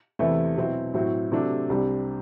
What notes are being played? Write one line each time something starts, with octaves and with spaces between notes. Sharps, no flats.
E2 C3 E3 A3 E4
B2 F#3 C4 E4
A2 F#3 C4 E4
C3 F#3 A3 D4
C2 C3 G3 D4